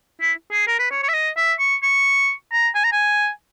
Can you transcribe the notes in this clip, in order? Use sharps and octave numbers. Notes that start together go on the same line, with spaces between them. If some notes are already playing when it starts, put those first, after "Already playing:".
E4
G#4
A#4
B4
C#5
C#5
E5
D#5
E5
C#6
C#6
A#5
G#5
A#5
G#5